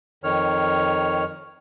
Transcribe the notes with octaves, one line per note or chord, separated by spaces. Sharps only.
F2 D#3 C#5 F6